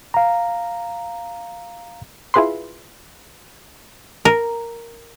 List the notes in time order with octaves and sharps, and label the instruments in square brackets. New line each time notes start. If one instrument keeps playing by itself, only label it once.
[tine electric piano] F5 A#5
[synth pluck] E4 F4 G#4 B4 B5 C6
[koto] A#4